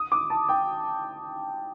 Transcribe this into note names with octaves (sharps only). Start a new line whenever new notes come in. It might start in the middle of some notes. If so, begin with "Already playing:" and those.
Already playing: D#6
D6
A5
G5